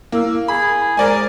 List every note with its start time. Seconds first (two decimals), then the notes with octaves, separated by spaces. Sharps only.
0.12 A#3 E4 E6
0.48 G#4 B5
0.97 G#3 A#4 C5 D5 G#5